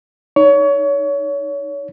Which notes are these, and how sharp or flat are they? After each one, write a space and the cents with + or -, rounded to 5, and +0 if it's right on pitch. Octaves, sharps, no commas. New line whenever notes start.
D#4 +0 C#5 +25